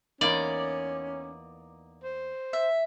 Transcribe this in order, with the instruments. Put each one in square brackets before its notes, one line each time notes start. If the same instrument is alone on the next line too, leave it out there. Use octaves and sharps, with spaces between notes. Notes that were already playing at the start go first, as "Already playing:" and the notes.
[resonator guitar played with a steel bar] E2 A#3 D#4 [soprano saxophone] C#4 [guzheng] D5
[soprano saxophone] C5
[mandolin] E5